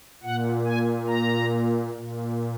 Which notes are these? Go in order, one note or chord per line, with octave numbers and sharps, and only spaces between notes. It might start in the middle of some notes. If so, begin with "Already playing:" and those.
A#2 F#5
G#5
A#5
A#2